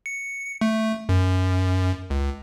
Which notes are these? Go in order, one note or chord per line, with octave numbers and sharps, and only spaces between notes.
C#7
A3
F#2
C#2